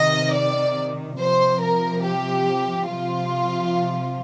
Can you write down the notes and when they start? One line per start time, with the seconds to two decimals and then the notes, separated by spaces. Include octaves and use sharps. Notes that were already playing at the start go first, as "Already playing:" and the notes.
Already playing: C3 D#3 D#5
0.35 D5
1.20 C3 F3 C5
1.62 A#4
2.05 G4
2.89 C3 F3 F4